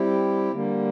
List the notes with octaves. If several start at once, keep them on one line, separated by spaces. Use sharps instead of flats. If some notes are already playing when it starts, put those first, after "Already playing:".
Already playing: G3 C4 E4 G4
D3 G3 A#3